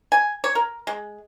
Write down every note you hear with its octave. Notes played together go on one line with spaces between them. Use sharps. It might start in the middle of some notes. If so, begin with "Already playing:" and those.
G#5
C#5
A#4
G#3